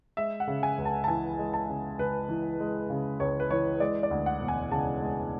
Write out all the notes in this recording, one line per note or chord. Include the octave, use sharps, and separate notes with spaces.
G#3 E5
F#5
C#3
G#5
C#2
A5
A5
E3 G#5
G#3
A5
C#3
C#2 B4
E3
G#3
C#3
C#2 C#5
B4
E3 C#5
G#3 D5
D5
D2
F#5
E1
G#5
C#3 A5
G#3